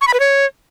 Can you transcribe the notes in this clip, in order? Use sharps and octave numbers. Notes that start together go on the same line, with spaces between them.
C#6
B5
B4
C#5